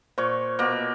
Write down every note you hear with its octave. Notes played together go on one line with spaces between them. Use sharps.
A#2 C5 C#5 C#6
B2 A#3